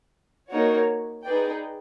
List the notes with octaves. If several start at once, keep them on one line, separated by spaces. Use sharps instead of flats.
A#3 D#4 F#4 A#4 C#5
D#4 G#4 B4 D5 G5